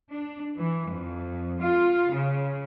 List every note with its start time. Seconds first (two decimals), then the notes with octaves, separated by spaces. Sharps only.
0.11 D4
0.57 E3
0.91 F2
1.58 F4
2.12 C#3